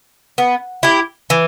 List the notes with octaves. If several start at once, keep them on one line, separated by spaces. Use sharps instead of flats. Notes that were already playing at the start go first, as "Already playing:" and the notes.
B3
E4 G4
E3